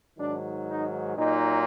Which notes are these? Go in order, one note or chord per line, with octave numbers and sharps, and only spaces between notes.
G#2 D#3 F#3 D4
D#4
A#2 F#3 D#4